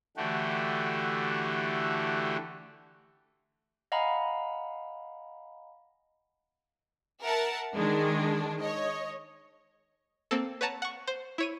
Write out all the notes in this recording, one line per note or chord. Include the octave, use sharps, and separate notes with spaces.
D3 E3 A3 F#4 G4
D#5 F5 F#5 G#5 A#5 B5
A#4 E5 F#5 A5
D#3 G#3 D4
C#5 D#5
A#3 C4 A4
B4 C#5 F#5 A5 A#5
F#5 C#6
C5
E4 C#5 D#7